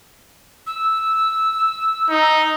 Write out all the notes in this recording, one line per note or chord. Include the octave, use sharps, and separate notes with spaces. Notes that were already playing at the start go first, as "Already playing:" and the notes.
E6
D#4